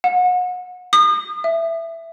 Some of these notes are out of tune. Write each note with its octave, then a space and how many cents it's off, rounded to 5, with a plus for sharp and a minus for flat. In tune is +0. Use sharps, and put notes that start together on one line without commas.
F#5 -35
D#6 -35
E5 +10